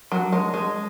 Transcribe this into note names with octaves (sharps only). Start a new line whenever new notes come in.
F#3
G#3
G#3